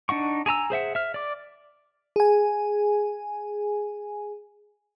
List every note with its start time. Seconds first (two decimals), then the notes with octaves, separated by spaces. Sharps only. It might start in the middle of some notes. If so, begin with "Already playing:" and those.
0.09 D4 D#4 F#5 C#6
0.46 G#4 G#5 A#5 E6
0.70 G#4 C5 E5 F#5
0.95 E5 F6
1.14 D5 D6
2.16 G#4 G#5